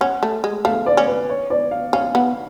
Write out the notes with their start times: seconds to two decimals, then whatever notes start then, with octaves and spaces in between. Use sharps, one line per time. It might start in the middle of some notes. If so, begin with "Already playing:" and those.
0.01 C#4 F#5
0.23 A3
0.44 G#3
0.65 A3 F5
0.86 D5
0.97 C#4
1.07 B4
1.29 C#5
1.50 D5
1.71 F5
1.93 C#4 F5
2.15 B3